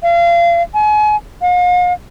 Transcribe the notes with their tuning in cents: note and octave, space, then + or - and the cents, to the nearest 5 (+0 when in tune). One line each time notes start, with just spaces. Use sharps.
F5 -30
G#5 +35
F5 +45